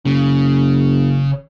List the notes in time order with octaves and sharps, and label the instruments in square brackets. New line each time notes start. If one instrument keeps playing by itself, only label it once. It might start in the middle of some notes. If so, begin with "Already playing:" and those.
[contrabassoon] F#1 [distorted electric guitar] C#3